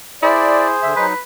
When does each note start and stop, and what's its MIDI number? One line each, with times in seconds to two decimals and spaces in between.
0.23 0.73 64
0.23 1.06 68
0.23 1.06 72
0.23 0.68 74
0.83 0.94 50
0.83 0.94 76
0.96 1.14 54
0.96 1.14 63
0.96 1.20 71